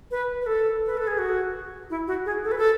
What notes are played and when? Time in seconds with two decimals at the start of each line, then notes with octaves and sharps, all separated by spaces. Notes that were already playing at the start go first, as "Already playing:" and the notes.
0.11 B4
0.41 B4
0.46 A4
0.86 B4
0.97 A4
1.07 G#4
1.18 F#4
1.90 E4
2.07 F#4
2.25 G#4
2.44 A4
2.52 B4
2.58 A4